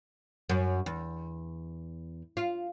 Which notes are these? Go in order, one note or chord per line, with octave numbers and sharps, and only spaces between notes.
F#2
E2
F4